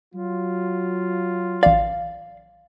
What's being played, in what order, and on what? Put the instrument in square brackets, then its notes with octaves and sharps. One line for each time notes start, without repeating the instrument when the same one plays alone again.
[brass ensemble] F#3 F4
[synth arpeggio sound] A1 D5 [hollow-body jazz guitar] F5